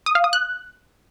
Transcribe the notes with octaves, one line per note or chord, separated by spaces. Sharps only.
D#6
F5
D#6
F#6